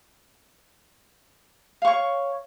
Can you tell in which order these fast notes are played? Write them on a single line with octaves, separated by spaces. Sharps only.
F5 C#6 C#5